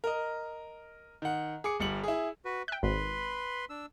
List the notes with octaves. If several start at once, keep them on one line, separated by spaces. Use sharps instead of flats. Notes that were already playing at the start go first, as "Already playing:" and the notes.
A#4 D#5
D#3 F#5
G#4 D6 C#7
G1 G3 C#7 F#7
E4 G#4
F#4 B4
E5 G5 F#6
G#1 B4 B5 C6
D4 E6